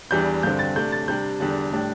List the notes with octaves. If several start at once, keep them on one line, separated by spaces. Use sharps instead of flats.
E2 E3 G3 D4 G6
G2 D3 C4 G6
A6
C3 A3 D4 G6
A6
C3 G3 D4 G6
E2 D3 G3 D4
A2 G3 D4